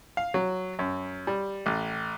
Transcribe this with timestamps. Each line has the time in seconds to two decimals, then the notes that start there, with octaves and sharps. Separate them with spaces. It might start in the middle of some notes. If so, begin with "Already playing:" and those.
0.17 F5
0.34 F#3
0.79 F#2
1.27 G3
1.66 A1